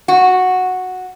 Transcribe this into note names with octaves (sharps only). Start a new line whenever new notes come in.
F#4